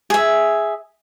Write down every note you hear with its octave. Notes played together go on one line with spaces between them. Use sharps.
G#4 E5